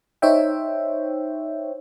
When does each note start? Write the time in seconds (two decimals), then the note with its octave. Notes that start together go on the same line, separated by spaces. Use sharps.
0.22 D#4 C5 C#5 E5 G5